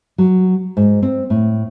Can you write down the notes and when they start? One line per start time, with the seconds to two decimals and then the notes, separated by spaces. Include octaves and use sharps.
0.18 F#3
0.77 G#2
1.02 C4
1.30 A2